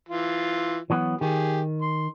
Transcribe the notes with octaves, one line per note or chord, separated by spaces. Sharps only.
E3 F4
E3 F#3 B3
D#3 G4 G#4
C6